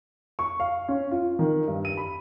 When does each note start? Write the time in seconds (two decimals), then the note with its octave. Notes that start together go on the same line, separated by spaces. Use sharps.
0.39 C#6
0.60 F5
0.89 C#4
1.11 F4
1.39 D#3
1.67 G2
1.85 D#7
1.97 B5